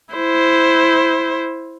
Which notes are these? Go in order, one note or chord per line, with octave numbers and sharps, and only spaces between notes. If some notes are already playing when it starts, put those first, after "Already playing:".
E4 C5